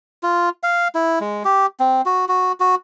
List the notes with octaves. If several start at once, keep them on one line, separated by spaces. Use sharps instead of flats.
F4
F5
E4
G#3
G4
C4
F#4
F#4
F#4